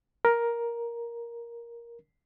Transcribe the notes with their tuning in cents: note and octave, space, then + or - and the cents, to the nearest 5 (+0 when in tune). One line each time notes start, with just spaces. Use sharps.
A#4 +10